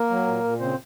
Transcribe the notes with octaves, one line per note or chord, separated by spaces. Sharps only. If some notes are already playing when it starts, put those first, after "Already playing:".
Already playing: A#3 A#4
F#3
A#2
A#2
C#3 C4 C5